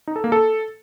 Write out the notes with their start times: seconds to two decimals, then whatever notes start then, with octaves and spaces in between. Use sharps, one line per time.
0.07 D#4
0.16 A4
0.24 A#3
0.32 A4